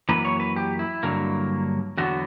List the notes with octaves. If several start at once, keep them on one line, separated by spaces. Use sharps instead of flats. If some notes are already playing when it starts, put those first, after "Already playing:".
F#2 E3 A#3 B4
C#5
B4
G4
E4
G2 D3 F#3 A#3
E2 D3 F#3 B3 F#4